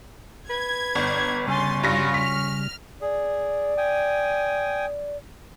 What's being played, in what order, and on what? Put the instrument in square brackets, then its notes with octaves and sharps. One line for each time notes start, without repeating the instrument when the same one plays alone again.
[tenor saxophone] B4 [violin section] G#6
[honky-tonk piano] G1 [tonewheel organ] D5 G6
[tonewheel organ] C#3 G3 [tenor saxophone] C#4 [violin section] G#5 C6 A6
[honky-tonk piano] G2 A#6 [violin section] F4 F#4
[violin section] F6 [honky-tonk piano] B6
[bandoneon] G#4 [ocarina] D5
[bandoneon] G5 G#5 D#6